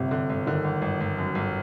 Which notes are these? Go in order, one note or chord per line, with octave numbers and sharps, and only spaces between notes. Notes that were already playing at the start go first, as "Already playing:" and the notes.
Already playing: G1 C3
D3
G1
D3 D#3
G1
G1
G1
F#2
G1